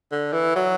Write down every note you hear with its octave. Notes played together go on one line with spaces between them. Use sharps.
D3
E3
F#3